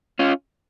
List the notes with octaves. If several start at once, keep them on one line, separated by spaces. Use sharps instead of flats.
C#4 F4